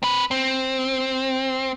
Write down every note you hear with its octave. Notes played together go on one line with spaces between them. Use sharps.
C4 B4
C4